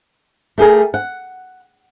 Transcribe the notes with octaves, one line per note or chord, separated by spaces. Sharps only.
A3 G4 G#4 A#4
F#5